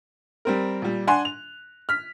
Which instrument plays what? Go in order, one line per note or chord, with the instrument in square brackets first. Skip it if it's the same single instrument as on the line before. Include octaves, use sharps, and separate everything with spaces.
[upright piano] G3 C4 A#4
A#2 G3
D4 F#5 G#5 C6 F#6
F7
F6 B6